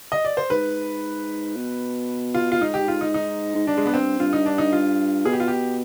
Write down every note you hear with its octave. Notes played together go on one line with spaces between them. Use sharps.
D#5
D5
C5
G#2 B4
B2
F4
F4
G#2 D#4
G4
F4
D#4
D#4
G#2
G2 D4
G#3
B3
C4
G2 F4
D#4
D4
D#4
F4
B2 G#4
G4
F4
G4